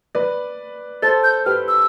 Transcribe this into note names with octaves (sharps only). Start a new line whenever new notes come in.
B4 D5
A4 C5 A6
G6
G4 B4 F6
E6